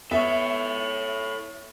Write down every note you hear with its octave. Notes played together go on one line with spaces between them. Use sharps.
B3 A4 C#5 E5